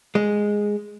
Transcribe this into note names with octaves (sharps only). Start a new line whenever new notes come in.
G#3